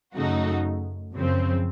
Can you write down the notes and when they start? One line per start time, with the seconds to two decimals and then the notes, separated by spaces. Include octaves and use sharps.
0.15 F#2 C#3 A3 D#4 F#4
1.13 F#2 C#3 F3 C4